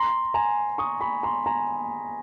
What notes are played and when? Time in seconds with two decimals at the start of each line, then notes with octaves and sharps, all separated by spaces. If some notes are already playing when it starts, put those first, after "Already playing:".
Already playing: A#5 C6
0.34 G#5 A#5
0.78 C#6 D#6
1.01 B5 C#6
1.23 A#5 C6
1.46 G#5 A#5